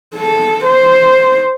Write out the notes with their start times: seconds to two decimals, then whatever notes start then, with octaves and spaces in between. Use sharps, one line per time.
0.15 A4
0.65 C5